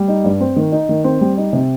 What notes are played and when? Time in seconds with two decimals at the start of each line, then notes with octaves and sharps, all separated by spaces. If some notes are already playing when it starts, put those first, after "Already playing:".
Already playing: G3
0.08 D#4
0.24 G2
0.41 C4
0.56 D#3
0.72 D#4
0.89 D#3
1.04 C4
1.21 G3
1.37 D#4
1.53 C3